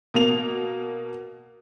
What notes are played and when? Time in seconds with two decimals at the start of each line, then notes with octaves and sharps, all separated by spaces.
0.14 B2 A#3 F7